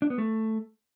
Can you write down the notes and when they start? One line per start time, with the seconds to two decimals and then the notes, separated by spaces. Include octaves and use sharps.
0.02 D4
0.10 B3
0.18 A3